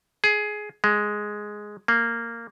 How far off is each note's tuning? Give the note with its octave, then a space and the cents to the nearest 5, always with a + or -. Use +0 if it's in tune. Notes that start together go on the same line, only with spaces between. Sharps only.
G#4 +15
G#3 +5
A#3 -10